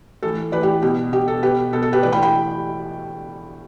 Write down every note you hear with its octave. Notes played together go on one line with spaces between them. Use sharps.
A2 E3 A4
A2 E3 B4 D5
G4
B2 G4
B2 G4
A4
B2 G4 B4
B2 A4
A4
G4 B4
A2 E3 B4 D5
G5 B5
G5 B5